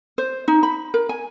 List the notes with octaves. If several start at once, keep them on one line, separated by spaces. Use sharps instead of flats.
C5
D#4
B5
A#4
G#5